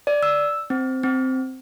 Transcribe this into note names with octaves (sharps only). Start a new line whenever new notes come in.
D5
E6
C4
C4